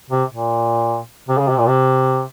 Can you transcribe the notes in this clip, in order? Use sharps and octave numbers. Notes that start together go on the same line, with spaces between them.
C3
A#2
C3
C#3
C3
A#2
C3